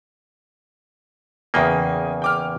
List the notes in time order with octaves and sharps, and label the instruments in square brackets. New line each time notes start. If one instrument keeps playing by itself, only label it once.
[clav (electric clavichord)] E2 C#3 A#3 [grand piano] G5 G#5 D#6
[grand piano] G5 D6 F6